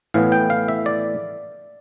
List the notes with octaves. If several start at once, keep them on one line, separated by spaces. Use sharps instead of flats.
A2 E3 B3 F5
G5
F5
E5
D5